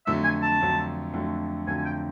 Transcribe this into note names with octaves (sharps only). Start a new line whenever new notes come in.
F2 D3 F#3 A3 E5
G#5
A5
F2 D3 F#3 A3
F2 D3 F#3 A3
F2 D3 F#3 A3 G#5
G#5
G5